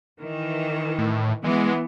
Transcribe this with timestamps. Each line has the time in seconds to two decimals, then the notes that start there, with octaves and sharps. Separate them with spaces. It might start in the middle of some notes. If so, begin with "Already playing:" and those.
0.20 D#3 E3
0.99 A2
1.44 E3 G#3 B3